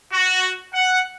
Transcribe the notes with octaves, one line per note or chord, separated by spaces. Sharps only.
F#4
F#5